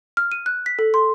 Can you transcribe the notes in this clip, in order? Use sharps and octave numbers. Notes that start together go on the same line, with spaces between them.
F6
D#7
F#6
B6
A4
C6